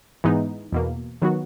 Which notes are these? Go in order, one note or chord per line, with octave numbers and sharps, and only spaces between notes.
G#2 E3 G#3 B3 D#4
E2 B2 A#3
D#3 F#3 B3 F#4